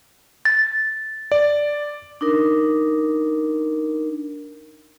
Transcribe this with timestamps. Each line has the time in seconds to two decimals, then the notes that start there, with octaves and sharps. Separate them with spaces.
0.45 A6
1.32 D5
2.21 D4 D#4 A#4